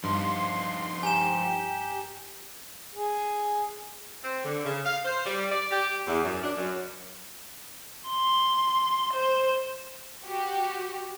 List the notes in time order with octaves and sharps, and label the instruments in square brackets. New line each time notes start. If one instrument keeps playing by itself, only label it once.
[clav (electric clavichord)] G2 [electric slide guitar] F3 D#4 F4 [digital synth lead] C6
[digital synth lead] G4 [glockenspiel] G#5 A#5 E7
[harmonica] G#4
[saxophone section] C4
D3
C#3
F5
C5
G3
D5
G4
E2
F#2
D4
F#2
[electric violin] C6
C5
[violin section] F#4 G4